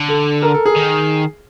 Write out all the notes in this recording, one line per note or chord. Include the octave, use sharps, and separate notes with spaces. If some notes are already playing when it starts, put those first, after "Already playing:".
Already playing: D3
A4
A#4
A4
G#4
D#3